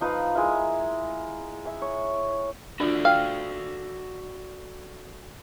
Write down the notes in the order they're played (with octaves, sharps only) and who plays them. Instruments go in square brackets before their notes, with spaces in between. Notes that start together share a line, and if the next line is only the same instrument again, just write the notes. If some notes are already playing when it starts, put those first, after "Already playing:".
[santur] F3 D#4 B4 F5
G#3 E4 A#4 E5
E5 G#5
C#5
[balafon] D4 F4 [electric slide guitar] F#4 A4 D5
[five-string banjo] F5 [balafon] G5